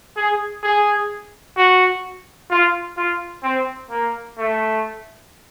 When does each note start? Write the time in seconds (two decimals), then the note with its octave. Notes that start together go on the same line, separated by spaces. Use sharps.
0.16 G#4
0.63 G#4
1.57 F#4
2.51 F4
2.97 F4
3.43 C4
3.90 A#3
4.38 A3